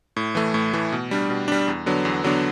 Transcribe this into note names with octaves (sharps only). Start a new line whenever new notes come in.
A2
E3 A3
A2
E3 A3
B2
G3 D4
B2
G3 D4
E2
D3 F#3 B3 D4
E2
D3 F#3 B3 D4